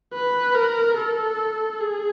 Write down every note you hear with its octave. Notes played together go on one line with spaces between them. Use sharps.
B4
A#4
A4
G#4